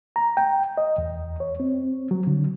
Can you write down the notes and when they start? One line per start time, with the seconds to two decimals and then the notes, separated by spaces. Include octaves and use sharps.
0.16 A#5
0.37 G5
0.78 D#5
0.98 E2
1.40 C#5
1.60 C4
2.11 F#3
2.27 D3